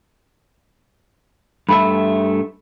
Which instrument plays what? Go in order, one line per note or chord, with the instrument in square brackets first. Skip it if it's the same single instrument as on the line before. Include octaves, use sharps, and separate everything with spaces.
[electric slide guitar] G2 A3 E5 [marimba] B5